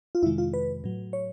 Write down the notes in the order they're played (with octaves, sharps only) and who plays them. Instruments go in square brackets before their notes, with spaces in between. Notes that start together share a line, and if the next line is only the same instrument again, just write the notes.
[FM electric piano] F4
F2 C3 D#3 G#3 E4
F4
B4
A2 F#3
C#5